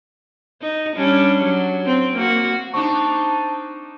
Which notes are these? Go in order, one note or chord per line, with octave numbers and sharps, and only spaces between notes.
D#4
G3 C#4 D4
F#3
C4
A#3 F#4
C4 D4 D#4 A5 C#6